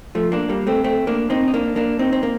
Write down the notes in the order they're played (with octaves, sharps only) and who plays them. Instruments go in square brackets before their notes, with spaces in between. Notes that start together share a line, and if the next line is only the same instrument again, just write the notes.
[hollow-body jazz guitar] F3 A3
A#3 D4
G3 A#3
A3 C4
A3 C4
A#3 D4
C4 D#4
D#4
A#3 D4
A#3 D4
C4 D#4
C4
A#3